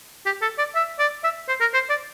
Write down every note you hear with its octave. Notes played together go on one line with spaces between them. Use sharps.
G4
A4
D5
E5
D5
E5
C5
A#4
C5
D5